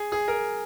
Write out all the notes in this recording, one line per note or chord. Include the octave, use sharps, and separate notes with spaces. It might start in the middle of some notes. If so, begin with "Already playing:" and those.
Already playing: G#4
G#4
A#4